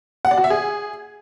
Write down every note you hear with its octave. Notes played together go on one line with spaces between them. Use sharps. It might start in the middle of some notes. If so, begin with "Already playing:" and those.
F#5
D5
F#4
E5
G#4